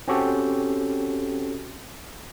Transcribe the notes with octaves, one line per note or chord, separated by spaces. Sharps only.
C4 C#4 F#4 G4 A4